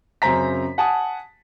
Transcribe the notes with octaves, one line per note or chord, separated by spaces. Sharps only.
F#2 C#3 C4 C5 A#5 B6
F#5 G#5 A5 D#6